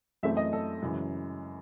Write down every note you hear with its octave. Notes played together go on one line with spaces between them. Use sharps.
F#2 E3 A3 C4 E5
D#5
A4
F#2 C#3 E3 G#3